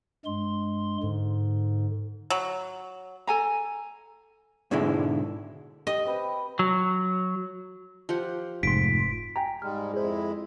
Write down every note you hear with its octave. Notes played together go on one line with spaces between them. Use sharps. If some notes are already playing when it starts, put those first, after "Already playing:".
G2 G#3 C6
G#2 D3
F#3
A4 G#5 A#5
G#2 B2 D3 G#3 E4
G4 D#5
C4 B4 G5
F#3
F3 G4 F#5
F1 G#2 C6 B6 D7
G5 G#5 A#5
G#2 G3 G#3 F6
F2 G#3 E4 G#4 C5